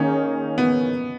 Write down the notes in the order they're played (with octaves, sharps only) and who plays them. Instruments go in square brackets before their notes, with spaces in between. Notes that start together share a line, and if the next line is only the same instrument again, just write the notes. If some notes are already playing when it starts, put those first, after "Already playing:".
Already playing: [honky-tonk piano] D#3 A#3 D#4 G#4 C#5 [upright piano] C#4
[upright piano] B3